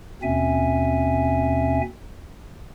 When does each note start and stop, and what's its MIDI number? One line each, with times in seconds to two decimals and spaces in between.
0.23 1.81 39
0.23 1.81 47
0.23 1.81 60
0.23 1.81 61
0.23 1.81 76
0.23 1.81 80